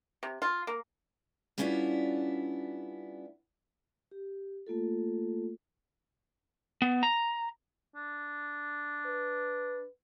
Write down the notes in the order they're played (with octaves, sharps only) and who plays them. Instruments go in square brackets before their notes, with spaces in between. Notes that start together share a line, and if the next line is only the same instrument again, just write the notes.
[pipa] C3
F4
A#3
[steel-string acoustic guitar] G3 B3 C#4 D4 E4 F4
[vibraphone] G4
A3 A#3 F4 A4
[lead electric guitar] B3
A#5
[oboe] D4
[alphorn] B4